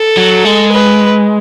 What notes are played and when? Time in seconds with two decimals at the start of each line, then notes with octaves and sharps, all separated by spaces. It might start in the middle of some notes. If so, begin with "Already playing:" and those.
Already playing: A4
0.17 F#3
0.45 G#3
0.72 B4